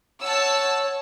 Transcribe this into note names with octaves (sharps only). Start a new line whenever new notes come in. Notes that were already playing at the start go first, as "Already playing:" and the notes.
C#5 F#5 A5 E6